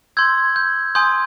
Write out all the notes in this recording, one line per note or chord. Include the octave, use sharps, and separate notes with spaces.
C6 E6 G6 G#6
G6
G#5 C6 D#6 G6